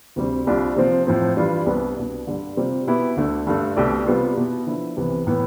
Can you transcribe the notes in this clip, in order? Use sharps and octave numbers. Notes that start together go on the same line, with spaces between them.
D2 C3 G3 C4
C2 C3 G3 D4 F4
C3 F3 C4
A2 F3 C4
G2 E3 G3 D4 F4
C2 C3 G3 B3 D4
C2 B2 B3 D4
G2 D3 G3
C3 G3 C4 F4
B2 B3 E4 G4
D2 D3 A3
G2 D3 A3
C2 B2 A3 D4 G4
C3 G3 B3 F4
B2 B3 E4 G4
D3 F3 B3 E4
C2 C3 E3 B3
A2 E3 B3